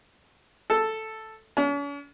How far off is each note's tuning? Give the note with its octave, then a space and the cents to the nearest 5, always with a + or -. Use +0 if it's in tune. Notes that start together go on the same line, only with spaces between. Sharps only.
A4 +0
C#4 +45